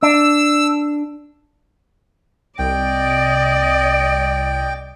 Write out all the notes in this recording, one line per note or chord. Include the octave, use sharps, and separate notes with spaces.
D4 E6
C2 D5 D#5 G5